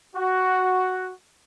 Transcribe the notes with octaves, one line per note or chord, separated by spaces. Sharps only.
F#4